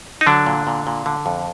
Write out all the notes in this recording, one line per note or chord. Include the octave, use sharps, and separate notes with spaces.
D#4
D3 F#3 D4
A#2
A#2
A#2
D3
F2